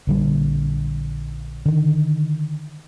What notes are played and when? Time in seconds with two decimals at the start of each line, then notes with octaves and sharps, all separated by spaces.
0.07 A#1 D3 G3
1.65 D3 D#3